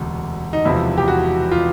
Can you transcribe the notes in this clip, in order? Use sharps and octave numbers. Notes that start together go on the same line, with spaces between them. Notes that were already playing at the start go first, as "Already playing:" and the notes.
Already playing: E1 D2 C3
D#4
E1 E2 C3 F3 E4
G4
F#4
F4